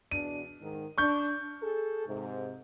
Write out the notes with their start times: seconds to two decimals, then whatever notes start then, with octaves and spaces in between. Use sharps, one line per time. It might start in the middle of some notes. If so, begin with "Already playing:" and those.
0.11 E2 B2 D4 D#7
0.61 G#2 D#3
0.98 D4 C#6 G6
1.61 G#4 A4
2.06 G#2 C3